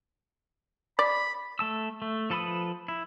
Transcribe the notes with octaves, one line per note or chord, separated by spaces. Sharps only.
D5 B5
A3 A5 E6
A3
F3 A4 B4 B5 D#6
E4